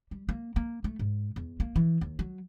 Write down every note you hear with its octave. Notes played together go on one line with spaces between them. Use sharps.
G3
A#3
A#3
A3
G#2
E2
A#3
E3
D#2
F#3